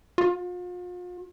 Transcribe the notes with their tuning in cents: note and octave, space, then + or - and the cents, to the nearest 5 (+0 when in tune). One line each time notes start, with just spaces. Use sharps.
F4 +40